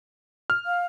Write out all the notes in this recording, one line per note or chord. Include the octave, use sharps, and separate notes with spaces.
F6
F5